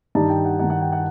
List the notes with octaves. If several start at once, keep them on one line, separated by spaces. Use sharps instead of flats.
G2 D#3 G3 D#4 A5
G5
F#5
G2 D#3 G3 D#4 F#5
F#5
G5
F#5